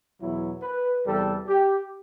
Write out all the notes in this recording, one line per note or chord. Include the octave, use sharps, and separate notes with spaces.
E2 B2 F#3 E4
B4
E2 C3 G3 A4
G4